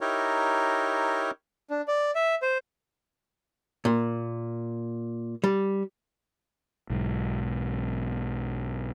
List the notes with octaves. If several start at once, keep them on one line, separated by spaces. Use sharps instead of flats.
D#4 E4 G4 A#4 C#5
D4
D5
E5
C5
A#2
G3
B1 G#2